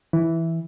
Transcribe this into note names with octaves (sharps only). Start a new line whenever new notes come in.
E3